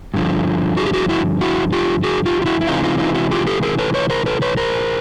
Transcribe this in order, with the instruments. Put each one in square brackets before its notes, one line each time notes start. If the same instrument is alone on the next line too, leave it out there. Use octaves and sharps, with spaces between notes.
[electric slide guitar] G2 D3 F3
F#4 G#4
G4
F#4 G#4
E4 F#4
E4 F#4
F4 G4
F#4 G#4
F4 G4
F4
E4 F#4
E4
C3 E3 G#3 D#4 F4
D#4 F4
D#4 F4
E4 F#4
F4 G4
G4 A4
G#4 A#4
A4 B4
B4 C#5
A#4 C5
A4 B4
B4 C#5
A#4 C5